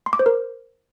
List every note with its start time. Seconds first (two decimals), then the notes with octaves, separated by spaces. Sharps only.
0.06 C6
0.13 D6
0.19 C5
0.26 A#4